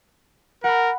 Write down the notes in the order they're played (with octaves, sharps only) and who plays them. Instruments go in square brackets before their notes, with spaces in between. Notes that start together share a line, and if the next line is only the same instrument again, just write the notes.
[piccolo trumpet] A#4 [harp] F#5 B5